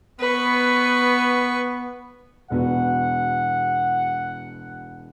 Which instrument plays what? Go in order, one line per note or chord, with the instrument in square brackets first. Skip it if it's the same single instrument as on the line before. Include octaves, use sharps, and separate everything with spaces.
[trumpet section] B3 [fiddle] B4 C#6
[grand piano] E1 B3 F#4 [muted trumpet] F#5